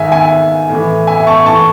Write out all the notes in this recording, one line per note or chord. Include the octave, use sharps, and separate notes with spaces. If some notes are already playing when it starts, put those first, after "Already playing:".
Already playing: G#2 D#3 E5 G#5
E5 G#5
A2 E3
E5 G#5
A5 C#6
A2 E3 A5 C#6